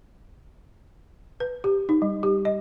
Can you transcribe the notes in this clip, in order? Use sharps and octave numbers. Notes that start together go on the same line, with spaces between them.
B4
G4
D#4
G3
G4
D#5